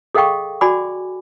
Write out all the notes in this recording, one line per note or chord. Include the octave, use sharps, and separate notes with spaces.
G#4 A4 D#5 F5 G5 C#6
F#4 D5 G#5 B5 D6